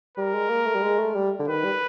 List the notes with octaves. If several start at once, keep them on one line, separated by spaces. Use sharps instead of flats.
G3 A#4
G#3
A#3
A3
G3
G#3
A3
G3
D3
D#3 B4
G3